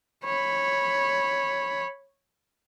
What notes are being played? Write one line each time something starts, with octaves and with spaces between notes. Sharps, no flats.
C#5 B5